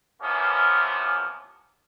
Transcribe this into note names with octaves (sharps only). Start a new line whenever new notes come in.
C3 E3 F3 A#3 B3 C#4